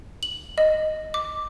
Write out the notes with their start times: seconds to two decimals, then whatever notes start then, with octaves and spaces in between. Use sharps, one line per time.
0.23 F#7
0.58 D#5
1.14 D6